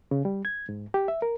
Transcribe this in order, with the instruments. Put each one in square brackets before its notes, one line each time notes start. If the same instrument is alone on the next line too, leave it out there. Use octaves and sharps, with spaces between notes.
[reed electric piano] C#3
G3
G#6
G#2
G4
E5
A#4